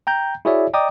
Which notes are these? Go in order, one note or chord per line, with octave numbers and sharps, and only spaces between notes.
G5 A#5 G6
E4 F#4 G#4 C#5 D5 E5
D5 D#5 G5 A#5 D6 D#6